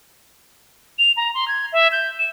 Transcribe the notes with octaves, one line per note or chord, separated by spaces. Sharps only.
F7
A#5
C6
G#6
E5
G6
E7